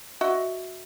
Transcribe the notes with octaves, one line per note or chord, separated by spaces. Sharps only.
F#4 D#5 E5